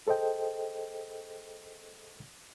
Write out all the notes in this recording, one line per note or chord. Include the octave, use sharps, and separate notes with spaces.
G#4 A4 C5 D#5 G5